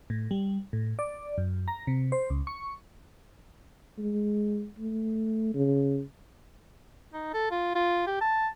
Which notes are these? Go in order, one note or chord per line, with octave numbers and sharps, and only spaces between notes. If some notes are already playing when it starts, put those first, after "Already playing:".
A2
G3
A2
D5
F#2
A#5
C3
C5
C#2
C#6
G#3
A3
C#3
D#4
A4
F4
F4
G4
A5